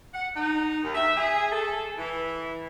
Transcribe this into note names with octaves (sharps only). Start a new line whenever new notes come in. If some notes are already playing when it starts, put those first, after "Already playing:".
F#5
D#4
D#2
E5
G#4
A4
E3